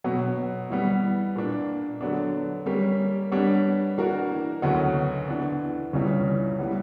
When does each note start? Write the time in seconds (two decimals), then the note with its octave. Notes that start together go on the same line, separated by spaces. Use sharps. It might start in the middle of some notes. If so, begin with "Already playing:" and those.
0.04 B2 F#3 B3
0.70 E3 G3 B3
1.35 A#2 A#3 D4
2.01 D3 F#3 B3 D4
2.66 G3 A#3 C#4 G4
3.32 G3 B3 D4 G4 C#5
3.98 E3 A#3 D4 F#4 A#4
4.62 D2 C#3 F#3 B3 F#4
5.28 E3 B3 D4
5.93 C#2 C#3 E3 G3 C#4
6.59 E3 G3 B3